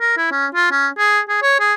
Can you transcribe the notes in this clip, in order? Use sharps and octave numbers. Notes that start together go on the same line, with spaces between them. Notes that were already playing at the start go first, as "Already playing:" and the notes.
A#4
E4
C#4
F4
C#4
G#4
G#4
C#5
G#4